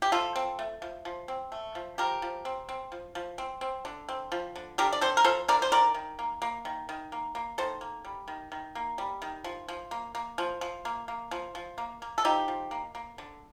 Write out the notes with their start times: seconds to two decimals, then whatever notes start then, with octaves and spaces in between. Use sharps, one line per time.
0.02 G4
0.12 F3 F4 A4
0.36 C4
0.59 A3
0.82 F3
1.05 F3
1.28 C4
1.52 A3
1.75 F3
1.98 F3 G4 A#4
2.22 F3
2.45 C4
2.69 C4
2.92 F3
3.15 F3
3.38 C4
3.61 C4
3.85 D3
4.09 C4
4.32 F3
4.56 D3
4.78 D3 G4 A#4
4.92 D5
5.01 C4 A4 C5
5.17 A#4
5.24 F3 A4 C5
5.48 D3 A#4 D5
5.62 C5
5.72 D#3 A#4 D5
5.94 D#3
6.19 A#3
6.42 A#3
6.65 D#3
6.89 D#3
7.12 A#3
7.35 A#3
7.58 D#3 A4 C5
7.81 A#3
8.05 G3
8.28 D#3
8.52 D#3
8.75 A#3
8.98 G3
9.22 D#3
9.44 F3
9.68 F3
9.91 A#3
10.15 A#3
10.38 F3
10.61 F3
10.85 A#3
11.08 A#3
11.31 F3
11.55 F3
11.78 A#3
12.02 A#3
12.18 A4
12.25 F3 D#4 G4
12.48 F3
12.71 A#3
12.95 A#3
13.18 D3